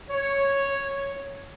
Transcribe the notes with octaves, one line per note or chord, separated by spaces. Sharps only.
C#5